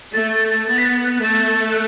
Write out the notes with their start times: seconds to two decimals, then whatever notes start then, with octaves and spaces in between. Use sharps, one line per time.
0.13 A3 A6
0.31 A6
0.50 A6
0.68 B3 A6
0.78 B6
0.86 A6
1.04 F#6
1.22 A3 A6
1.72 F#6